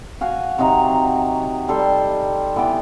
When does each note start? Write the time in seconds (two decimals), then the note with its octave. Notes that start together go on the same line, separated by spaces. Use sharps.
0.21 F#4 F5 G#5
0.58 C3 F#3 D#4 A#5
1.69 G3 A4 C6
2.56 E3 B3 D5 G5